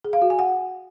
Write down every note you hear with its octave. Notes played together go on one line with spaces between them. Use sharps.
G#4
F5
F#4
G#5
F#5